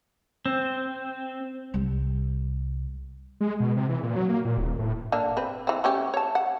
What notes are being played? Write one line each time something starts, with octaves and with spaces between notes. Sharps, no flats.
C4
C2 G3
G#3
B2
C3
E3
A#2
F#3
A#3
A#2
D#1
A2
D3 A#3 D4
C4 B4
E3 C4
A3 C#4 G4
C#5 A5
F#5